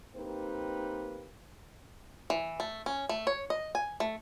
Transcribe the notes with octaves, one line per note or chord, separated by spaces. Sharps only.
A#3 C4 D#4 G4 B4
E3
A3
C#4
A3
C#5
D#5
G#5
A3